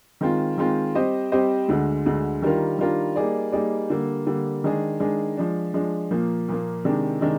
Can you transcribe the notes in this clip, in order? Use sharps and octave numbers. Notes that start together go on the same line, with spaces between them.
D#3 G#3 C4 F4
D#3 G#3 C4 F4
G3 C4 G4 C5 D#5
G3 C4 G4 C5 D#5
D2 D3 G#3
D2 D3 G#3
D#3 G3 D4 F4 A#4
D#3 G3 D4 F4 A#4
G3 A#3 D#4 G#4 D5
G3 A#3 D#4 G#4 D5
D3 G3 A#3
D3 G3 A#3
D#3 G#3 D4 G#4
D#3 G#3 D4 G#4
F3 G#3 D4
F3 G#3 D4
A#2 F3 A#3
A#2 F3 A#3
C3 D#3 G#3 D4
C3 D#3 G#3 D4